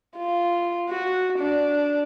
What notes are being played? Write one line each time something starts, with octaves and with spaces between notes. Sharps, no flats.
F4
F#4
D4